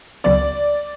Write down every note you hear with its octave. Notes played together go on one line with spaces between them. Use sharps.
C#2 C#3 F#3 B3 D5